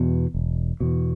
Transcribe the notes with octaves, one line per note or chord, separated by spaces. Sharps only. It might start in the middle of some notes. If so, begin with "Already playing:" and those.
Already playing: E2 B2
E1
E2 B2